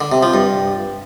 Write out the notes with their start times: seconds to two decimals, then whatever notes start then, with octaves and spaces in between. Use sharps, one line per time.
0.01 D3
0.12 C3
0.23 F3
0.34 G2